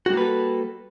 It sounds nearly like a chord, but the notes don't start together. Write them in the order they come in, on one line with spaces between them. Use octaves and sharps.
F#4 G3 A#3 B4 A4